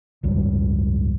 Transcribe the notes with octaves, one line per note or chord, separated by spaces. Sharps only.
G#1 C#2 F#2 G3